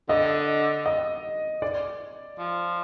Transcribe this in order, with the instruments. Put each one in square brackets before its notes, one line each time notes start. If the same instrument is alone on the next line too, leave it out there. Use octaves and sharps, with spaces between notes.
[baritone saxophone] D3 [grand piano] D#5
[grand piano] D#5
D5
[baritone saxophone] F3